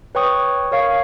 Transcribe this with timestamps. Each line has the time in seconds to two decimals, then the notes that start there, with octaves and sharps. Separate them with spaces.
0.15 B4 C#5 G5 C#6 D#6
0.72 A#4 C#5 F5 C#6 C7